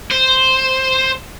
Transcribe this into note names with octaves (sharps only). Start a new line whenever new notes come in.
C5